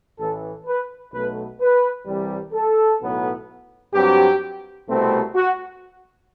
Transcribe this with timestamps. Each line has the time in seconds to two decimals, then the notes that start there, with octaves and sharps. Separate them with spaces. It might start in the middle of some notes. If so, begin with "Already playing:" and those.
0.19 A1 A2 E3 A4
0.67 B4
1.13 B1 B2 A3 B4
1.60 B4
2.07 C2 C3 E3 G3
2.53 A4
3.00 B1 A2 F#3 B3
3.94 G2 F#3 C4 G4
4.88 C2 B2 A3 C4
5.35 F#4